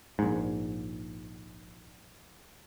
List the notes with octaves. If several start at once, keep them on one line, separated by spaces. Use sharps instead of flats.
A#1 G#2